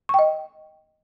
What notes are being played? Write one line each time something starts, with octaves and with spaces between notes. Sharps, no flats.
D#5 G5 C#6